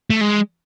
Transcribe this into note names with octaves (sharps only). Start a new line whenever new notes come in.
A3
G#3